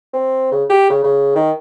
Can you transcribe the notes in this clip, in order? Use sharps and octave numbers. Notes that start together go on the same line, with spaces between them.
C4
C#3
G4
C#3
C#3
D#3